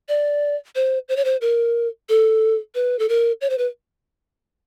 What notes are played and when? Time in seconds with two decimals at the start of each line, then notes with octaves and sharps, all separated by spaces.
0.09 D5
0.75 C5
1.09 C5
1.16 C#5
1.25 C5
1.41 A#4
2.09 A4
2.75 B4
2.99 A4
3.09 A#4
3.41 C#5
3.50 C5
3.58 B4